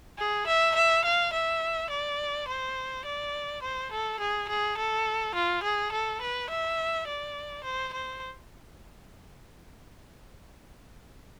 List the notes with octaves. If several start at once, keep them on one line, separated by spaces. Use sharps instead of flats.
G#4
E5
E5
F5
E5
D5
C5
D5
C5
A4
G#4
G#4
A4
F4
G#4
A4
B4
E5
D5
C5
C5